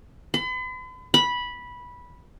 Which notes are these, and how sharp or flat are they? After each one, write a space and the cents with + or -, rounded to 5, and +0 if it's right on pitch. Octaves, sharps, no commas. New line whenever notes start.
B5 +45
B5 -10